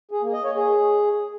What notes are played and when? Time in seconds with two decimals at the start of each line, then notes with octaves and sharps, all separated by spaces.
0.11 G#4
0.22 A#3
0.33 D#5
0.44 C#5
0.55 G#4